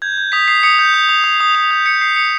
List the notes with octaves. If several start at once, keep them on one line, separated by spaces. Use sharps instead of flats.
G6 G#6
G6
D#6 B6
D#6 C7
D#6 C#7
G6
D#6
D#6
D#6
D#6
D#6
G6
G6 C#7
D#6 C7
D#6 C#7